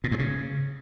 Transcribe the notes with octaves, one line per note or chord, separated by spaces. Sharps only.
A#2
G2
C#3